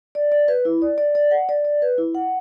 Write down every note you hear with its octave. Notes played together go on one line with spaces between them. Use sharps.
D5
D5
B4
E4
D5
D5
D5
F#5
D5
D5
B4
E4
F#5